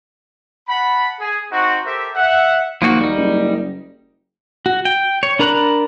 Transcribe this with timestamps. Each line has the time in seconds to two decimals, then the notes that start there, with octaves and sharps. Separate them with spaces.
0.69 F#5 A5 B5
1.20 G#4
1.52 C4 D#4 F#4
1.86 G4 A4 A#4 C5 E5
2.14 E5 F#5
2.82 D#2 F3 A#3 F#4
3.00 G3 D#4
3.17 F#1
4.66 F#4
4.85 G5
5.23 C#5
5.39 D4 A#4 A#5 B5 F#6